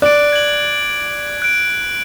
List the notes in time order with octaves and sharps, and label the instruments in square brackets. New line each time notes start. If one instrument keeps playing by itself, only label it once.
[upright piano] D5 [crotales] F#6 D7
[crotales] G#6 F#7
F#6 D7